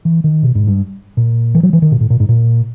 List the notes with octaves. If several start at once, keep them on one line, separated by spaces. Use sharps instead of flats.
E3
D#3
B2
G#2
G2
A#2
E3
F#3
E3
D#3
A#2
A2
A#2
G#2
A#2